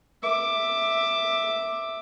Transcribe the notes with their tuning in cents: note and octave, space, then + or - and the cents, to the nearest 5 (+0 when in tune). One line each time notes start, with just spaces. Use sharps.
E5 +0 D6 +10